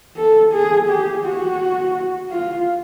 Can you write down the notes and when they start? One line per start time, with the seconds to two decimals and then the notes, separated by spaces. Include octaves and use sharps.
0.17 A4
0.53 G#4
0.89 G4
1.25 F#4
2.31 F4